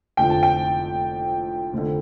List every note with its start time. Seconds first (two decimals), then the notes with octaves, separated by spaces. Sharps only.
0.17 F1 F2 D3 F3 G5
0.30 A5
0.43 G5
1.73 F1 F2 D3